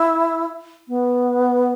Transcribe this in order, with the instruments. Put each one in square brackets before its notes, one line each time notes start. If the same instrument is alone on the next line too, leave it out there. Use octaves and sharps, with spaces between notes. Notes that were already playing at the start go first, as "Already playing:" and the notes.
Already playing: [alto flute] E4
B3